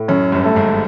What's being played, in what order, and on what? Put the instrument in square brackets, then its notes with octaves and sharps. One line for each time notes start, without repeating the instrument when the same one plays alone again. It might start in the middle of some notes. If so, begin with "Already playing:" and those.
Already playing: [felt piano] A2
[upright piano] F#2 [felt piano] C#4
[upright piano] G1 G2
[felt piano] A3
[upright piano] G#1 G#2